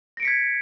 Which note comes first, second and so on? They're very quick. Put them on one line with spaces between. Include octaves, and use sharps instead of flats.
A#6 D7 C#7 B6 G#6